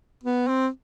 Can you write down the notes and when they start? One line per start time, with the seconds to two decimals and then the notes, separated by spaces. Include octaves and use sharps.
0.24 B3
0.48 C4